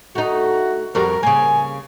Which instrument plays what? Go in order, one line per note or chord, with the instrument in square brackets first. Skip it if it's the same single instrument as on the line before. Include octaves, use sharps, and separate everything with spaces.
[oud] A3 D#4 [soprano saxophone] F#4
[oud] F2 G3 F#4 [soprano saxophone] A#4
[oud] C#3 A#3 [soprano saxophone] G#5